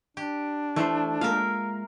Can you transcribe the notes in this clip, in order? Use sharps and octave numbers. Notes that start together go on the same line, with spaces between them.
D4 G4
E3 A3 E4 C5
G#3 A#3 F4 A#4 E5 F5